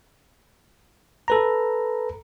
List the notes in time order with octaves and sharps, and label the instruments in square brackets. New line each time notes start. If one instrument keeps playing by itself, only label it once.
[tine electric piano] A4 B4 A#5